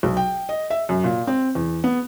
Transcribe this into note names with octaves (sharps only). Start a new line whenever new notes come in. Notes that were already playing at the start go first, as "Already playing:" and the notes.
B1
G5
D#5
E5
F#2
A#2
C4
E2
B3